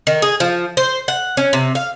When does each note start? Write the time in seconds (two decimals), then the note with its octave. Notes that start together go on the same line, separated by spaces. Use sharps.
0.07 D#3
0.22 G#4
0.40 F3
0.77 C5
1.08 F#5
1.37 C#4
1.53 C3
1.75 F5